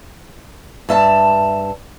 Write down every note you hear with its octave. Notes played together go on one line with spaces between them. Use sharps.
G2 E5 A5